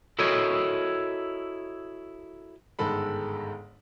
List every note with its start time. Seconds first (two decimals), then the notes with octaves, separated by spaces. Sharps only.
0.19 E4 F#4 A4 A#4 C#5 D#5
2.79 G1 G#2 D#3 G#3 A4 B5